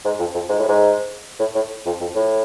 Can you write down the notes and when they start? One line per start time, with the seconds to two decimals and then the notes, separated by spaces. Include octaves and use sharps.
0.05 G#2
0.19 F2
0.34 F2
0.49 G#2
0.59 A2
0.69 G#2
1.40 A2
1.55 A2
1.86 F2
2.01 F2
2.15 A2